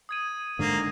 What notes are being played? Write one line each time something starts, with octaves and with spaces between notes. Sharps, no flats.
D#6 G#6 D#7
G#2 D3 A#3